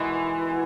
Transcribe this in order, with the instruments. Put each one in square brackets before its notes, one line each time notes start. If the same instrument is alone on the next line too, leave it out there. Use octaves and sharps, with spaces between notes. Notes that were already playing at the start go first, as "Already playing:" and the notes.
Already playing: [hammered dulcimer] B2 D#3 G#3 B3 F#4 [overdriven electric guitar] E3
[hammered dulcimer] B3 E4